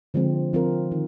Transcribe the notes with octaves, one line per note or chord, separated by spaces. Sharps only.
D3 F3 G#3 C4
F3 C4 F4 A#4
D#3